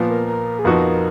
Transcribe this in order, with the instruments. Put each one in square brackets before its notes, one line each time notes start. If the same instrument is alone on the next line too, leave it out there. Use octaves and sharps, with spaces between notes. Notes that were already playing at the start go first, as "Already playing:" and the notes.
Already playing: [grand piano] A#2 F3 B3
[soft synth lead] A#4
A#4
G#4
[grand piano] F2 F3 B3 D#4 F#4 [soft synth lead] A#4